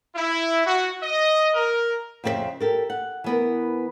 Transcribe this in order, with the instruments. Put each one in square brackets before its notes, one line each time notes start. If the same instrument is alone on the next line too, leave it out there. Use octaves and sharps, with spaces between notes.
[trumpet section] E4
F#4
D#5
A#4
[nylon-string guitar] F2 C#3 C4 A4 C5 E5
G4 A4 A#4
F#5
E3 B3 A#4